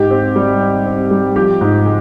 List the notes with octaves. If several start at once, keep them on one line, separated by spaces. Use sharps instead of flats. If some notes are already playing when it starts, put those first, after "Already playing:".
Already playing: G#2 G4
C4
G3
C4
C4
G3
F3 G4
G#2
G#3